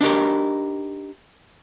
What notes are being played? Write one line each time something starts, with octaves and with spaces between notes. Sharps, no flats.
D4 D#4 G4 A#4